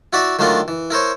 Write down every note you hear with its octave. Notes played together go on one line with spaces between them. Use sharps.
E4 F#4 D5 E5
D#3 F#3 A3 D4 F4 A#4
E3
E4 A#4 C5 C#5